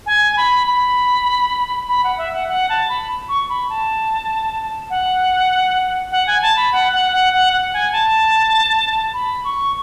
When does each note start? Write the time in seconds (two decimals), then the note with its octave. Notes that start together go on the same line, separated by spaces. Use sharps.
0.06 G#5
0.37 B5
0.67 B5
1.88 B5
2.04 F#5
2.18 E5
2.33 F#5
2.48 F#5
2.69 A5
2.89 B5
3.29 C#6
3.49 B5
3.69 A5
4.90 F#5
6.12 F#5
6.27 G#5
6.42 A5
6.56 B5
6.72 F#5
6.93 F#5
7.12 F#5
7.33 F#5
7.53 F#5
7.74 G#5
7.93 A5
9.14 B5
9.44 C#6